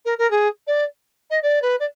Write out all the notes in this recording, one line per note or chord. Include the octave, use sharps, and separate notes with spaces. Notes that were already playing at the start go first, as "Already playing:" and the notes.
A#4
A#4
G#4
D5
D#5
D5
B4
D5